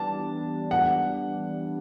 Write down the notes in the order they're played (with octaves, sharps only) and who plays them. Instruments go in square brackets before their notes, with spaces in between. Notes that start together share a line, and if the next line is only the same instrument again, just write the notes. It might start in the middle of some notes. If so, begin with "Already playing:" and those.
Already playing: [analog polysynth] E3 G3 B3 D4 [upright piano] A5
[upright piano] F#5